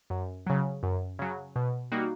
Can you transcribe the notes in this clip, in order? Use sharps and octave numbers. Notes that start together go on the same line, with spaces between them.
F#2
C#3 F#3
F#2
C#3 F#3
B2
G3 A#3 D#4 F#4